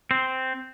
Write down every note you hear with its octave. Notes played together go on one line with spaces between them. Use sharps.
C4